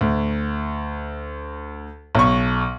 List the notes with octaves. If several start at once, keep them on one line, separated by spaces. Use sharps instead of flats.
D2
B1 C#6